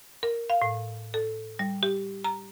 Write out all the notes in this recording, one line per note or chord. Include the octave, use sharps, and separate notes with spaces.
A#4
F5
A2
A4
G3
G4
A#5